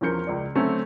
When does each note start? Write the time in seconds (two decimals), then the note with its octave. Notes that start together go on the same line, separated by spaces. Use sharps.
0.01 E2 F3 C#4 A#4 G6 C#7
0.27 C#2 D5
0.55 D3 F#3 A3 C4 C#4